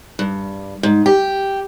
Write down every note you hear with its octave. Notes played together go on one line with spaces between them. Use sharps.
G2
G#2
G4